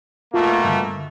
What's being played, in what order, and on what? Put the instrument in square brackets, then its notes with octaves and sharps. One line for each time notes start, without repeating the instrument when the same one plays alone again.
[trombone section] B2 A3 A#3 [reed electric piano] F4
[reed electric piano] G2 D3